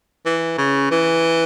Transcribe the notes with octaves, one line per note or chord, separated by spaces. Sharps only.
E3
C#3
E3